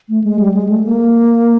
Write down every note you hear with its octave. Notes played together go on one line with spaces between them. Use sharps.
A3
G#3
G3
G#3
A3
A#3